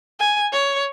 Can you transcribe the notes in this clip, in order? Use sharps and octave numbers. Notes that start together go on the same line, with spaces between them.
G#5
C#5